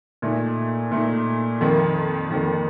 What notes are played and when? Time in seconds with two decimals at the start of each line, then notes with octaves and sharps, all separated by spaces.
0.22 A#2 A3 D#4
0.91 A#2 A3 D#4
1.61 F2 D#3 A#3
2.30 F2 D#3 A#3